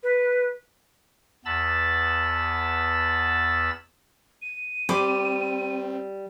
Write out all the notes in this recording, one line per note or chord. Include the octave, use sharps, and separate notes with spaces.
B4
E2 B3 A5 B5 E6 A6
D#7
G3 C4 C5 B5 D6